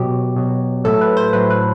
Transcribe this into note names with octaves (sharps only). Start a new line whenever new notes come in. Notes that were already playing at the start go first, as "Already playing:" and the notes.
Already playing: B2 F#3 G4
B2 F#3
A2 F#3 A4
B4
C5
A2 F#3 B4
B4